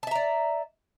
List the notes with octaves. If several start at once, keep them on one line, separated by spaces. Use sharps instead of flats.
D5 E5 A5 A#5